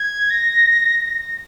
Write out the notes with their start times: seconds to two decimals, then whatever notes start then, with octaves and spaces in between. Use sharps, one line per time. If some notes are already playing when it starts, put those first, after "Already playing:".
Already playing: G#6
0.30 A#6
1.03 A#6